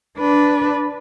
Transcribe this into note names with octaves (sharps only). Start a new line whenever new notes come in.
D4 B4